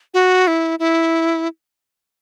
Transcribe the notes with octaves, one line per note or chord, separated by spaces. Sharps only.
F#4
E4
E4